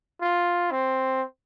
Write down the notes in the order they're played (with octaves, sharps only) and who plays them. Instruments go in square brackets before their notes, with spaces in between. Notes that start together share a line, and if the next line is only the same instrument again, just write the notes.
[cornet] F4
C4